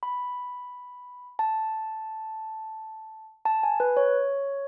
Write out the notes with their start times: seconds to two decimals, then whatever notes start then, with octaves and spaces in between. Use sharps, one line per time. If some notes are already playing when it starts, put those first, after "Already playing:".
0.03 B5
1.39 A5
3.45 A5
3.63 G#5
3.80 B4
3.97 C#5